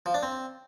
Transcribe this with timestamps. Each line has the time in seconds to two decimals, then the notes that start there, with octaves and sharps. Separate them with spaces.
0.06 F3
0.14 D4
0.23 C4